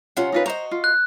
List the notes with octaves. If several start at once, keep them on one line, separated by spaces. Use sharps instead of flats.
C3 F#3 C#4 F4 F#5
D#4 F4 B4
F#4 C5 D#5 A#5
F4
F#6